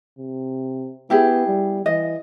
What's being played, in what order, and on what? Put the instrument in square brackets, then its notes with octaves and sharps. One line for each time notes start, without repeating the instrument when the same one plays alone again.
[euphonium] C3
[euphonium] B3 [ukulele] E4 G4 G#4
[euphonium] G3
[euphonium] E3 [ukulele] D#5